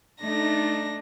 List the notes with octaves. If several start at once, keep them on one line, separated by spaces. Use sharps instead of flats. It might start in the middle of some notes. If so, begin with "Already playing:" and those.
A3 D4 D#4 A#6